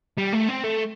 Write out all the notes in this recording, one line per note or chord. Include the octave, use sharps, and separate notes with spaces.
G3
A3
C4
A3